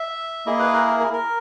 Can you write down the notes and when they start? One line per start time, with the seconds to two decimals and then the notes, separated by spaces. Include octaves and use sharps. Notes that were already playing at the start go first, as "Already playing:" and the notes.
Already playing: E5
0.46 A#3 E4 G#4 D#5
0.60 B4
0.73 A#4
0.87 A#4
1.00 A#4
1.13 A#4